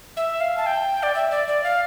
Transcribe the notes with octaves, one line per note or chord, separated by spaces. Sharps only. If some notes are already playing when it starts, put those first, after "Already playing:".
E5
F5
A5
G5
D5
E5
D5
D5
F5